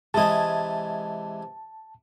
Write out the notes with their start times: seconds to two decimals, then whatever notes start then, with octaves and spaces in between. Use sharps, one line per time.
0.14 C3 E3 G#3 D#5 G#5 A5